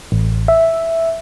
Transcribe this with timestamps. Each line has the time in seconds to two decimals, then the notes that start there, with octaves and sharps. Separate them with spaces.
0.12 A1
0.48 E5